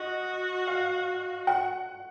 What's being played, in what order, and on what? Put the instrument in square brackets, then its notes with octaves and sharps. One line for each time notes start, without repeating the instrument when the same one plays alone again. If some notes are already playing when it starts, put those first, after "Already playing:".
Already playing: [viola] F#4 [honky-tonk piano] D#5
[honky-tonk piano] F5
F#5